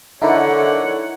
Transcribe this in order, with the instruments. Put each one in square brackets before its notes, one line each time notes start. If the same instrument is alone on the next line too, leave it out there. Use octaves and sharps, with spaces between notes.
[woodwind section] D3 [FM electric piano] D#4 E4 A#4 [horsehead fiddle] C#5 F#5